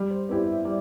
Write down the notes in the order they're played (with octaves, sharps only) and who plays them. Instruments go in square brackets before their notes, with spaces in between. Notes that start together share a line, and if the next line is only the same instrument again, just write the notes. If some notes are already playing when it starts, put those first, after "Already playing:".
Already playing: [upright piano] G3
[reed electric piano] C5
[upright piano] B3 E4 G4 [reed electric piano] D5
[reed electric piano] E5
[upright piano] G3 [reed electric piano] D5